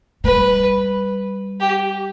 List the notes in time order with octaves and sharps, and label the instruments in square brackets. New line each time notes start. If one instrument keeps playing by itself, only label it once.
[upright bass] G3 [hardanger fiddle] B4
[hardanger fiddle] G4